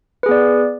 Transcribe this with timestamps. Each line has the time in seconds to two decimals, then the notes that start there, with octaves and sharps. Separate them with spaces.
0.23 B4
0.26 G#4
0.29 B3
0.31 D5